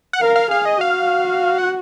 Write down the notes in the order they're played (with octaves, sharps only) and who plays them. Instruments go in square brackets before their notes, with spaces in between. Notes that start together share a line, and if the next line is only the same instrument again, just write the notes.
[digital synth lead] F#5
[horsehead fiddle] A#4 [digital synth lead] F5
[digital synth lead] F5
[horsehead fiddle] G#4 [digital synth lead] F5
[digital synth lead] D#5
[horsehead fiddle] F#4 [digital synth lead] F5
[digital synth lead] F#5